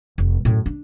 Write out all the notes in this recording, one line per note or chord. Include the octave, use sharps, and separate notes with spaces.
F1
F#2 A2
D4